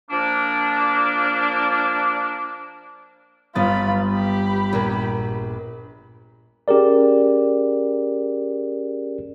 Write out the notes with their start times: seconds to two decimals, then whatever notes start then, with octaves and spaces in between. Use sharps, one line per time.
0.11 F3 A#3 D4
3.55 G1 B3 F4 B5 A6
4.10 G4 B5
4.73 A#1 A#3
6.68 C#4 G4 G#4 A#4 D5